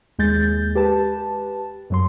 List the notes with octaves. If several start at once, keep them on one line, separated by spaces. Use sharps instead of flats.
D#2 G#3 G6 A6
G4 B4 A5
F#2 F#3 C6